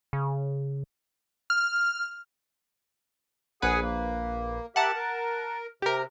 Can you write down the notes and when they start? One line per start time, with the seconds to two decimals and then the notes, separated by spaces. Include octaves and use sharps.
0.13 C#3
1.50 F6
3.62 A#1 G#4 B4 F#5 G#5
3.82 A#3
4.76 G4 A#4 E5 F#5 A5
4.95 A#4
5.82 C3 G4 A#4